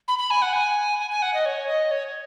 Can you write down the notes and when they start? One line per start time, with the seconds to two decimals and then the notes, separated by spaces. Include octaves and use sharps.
0.08 B5
0.19 B5
0.31 G#5
0.42 F#5
0.53 G#5
0.99 G#5
1.11 G#5
1.22 F#5
1.34 D#5
1.45 C#5
1.68 D#5
1.91 C#5